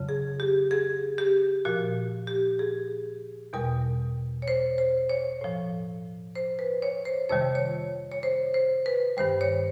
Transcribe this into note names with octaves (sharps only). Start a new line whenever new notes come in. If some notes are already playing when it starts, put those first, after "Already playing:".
Already playing: F2 C#3 F#3
G#4
G4
G#4
G4
A#2 F3 F#4
G4
G#4
E2 B2 G3 A#4
C#5
C5
C5
C#5
A2 F3
C5
B4
C#5
C5
F2 C3 D#3 G3 C#5
C#5
C#5
C5
C5
B4
G2 D#3 G3 C5
C#5